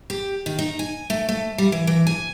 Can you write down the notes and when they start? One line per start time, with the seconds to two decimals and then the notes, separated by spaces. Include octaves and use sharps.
0.10 G4
0.46 D#3
0.59 D#4
0.79 G#5
1.10 A3
1.29 A3
1.58 G3
1.72 E3
1.87 E3
2.07 G#5